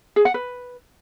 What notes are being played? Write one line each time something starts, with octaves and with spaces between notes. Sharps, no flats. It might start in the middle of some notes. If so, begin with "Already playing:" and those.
G#4
F#5
B4